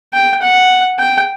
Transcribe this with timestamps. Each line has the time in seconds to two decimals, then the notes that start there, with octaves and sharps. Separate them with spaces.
0.13 G5
0.42 F#5
0.99 G5